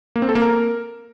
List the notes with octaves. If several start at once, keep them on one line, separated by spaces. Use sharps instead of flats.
A#3
C4
A4
A#3
A#4